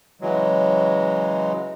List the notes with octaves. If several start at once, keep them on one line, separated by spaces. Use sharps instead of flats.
C#3 E3 F#3 G#3